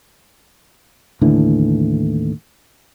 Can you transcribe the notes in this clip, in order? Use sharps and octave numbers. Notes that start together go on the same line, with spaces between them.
D#2 A2 D3 E3